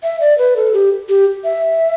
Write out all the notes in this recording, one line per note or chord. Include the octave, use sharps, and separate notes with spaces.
E5
D5
B4
A4
G4
G4
E5